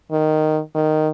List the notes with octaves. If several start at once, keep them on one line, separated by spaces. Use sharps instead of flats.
D#3
D#3